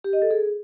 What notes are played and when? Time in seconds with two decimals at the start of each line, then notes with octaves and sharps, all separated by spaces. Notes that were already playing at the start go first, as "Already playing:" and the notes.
0.04 G4
0.13 D#5
0.22 A4
0.31 G#4